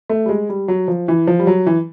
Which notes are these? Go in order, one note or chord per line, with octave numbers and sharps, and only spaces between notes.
A3
G3
G#3
G3
F#3
F3
E3
F3
G3
F#3
E3